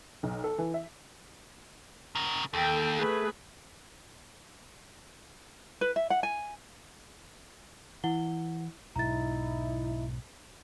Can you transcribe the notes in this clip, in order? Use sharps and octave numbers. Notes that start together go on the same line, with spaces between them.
B1
A4
E3
E5
C#3 A#4
D#2 A4 G5
A3 G#4 B4
B4
E5
F#5
G#5
E3 E4 F#5 G7
B1 G#2 D#4 E4 A#5 A6